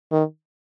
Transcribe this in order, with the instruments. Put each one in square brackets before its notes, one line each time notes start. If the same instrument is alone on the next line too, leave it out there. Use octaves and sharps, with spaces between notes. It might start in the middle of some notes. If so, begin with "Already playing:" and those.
[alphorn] D#3